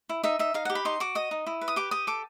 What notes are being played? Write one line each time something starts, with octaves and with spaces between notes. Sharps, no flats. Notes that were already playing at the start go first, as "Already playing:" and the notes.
E4
D#4 E5
D#4 E5
D#4 F5
F#5
G4
B5
D#4 C6
F#4 D6
D#5 D#6
D#4
E4
B4
D#6
G4 D6
G4 D#6
A4 D6